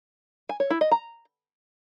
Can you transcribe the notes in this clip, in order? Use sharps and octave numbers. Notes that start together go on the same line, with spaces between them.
G#5
C#5
E4
D#5
A#5